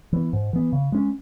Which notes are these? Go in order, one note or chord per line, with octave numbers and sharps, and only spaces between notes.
E3 B3
G#2
E3 B3
C#3
G#3 C#4